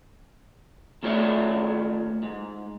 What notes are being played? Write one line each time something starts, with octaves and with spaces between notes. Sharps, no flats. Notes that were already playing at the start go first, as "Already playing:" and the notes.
D#2 A3 F4 C#5 D5 E5
G#2